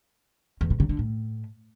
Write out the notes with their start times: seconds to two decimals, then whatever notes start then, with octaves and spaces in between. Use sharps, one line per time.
0.61 E2
0.70 B2
0.80 C#3
0.89 D3
0.99 A2